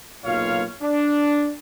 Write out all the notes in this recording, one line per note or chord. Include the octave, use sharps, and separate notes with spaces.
F#1 B1 A#2 F4 C#5 F5
D4